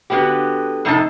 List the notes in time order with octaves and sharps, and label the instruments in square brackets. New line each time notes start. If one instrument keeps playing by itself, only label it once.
[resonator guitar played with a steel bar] D3 B3 F#4 G4
F2 A2 C3 D#4 F4 A5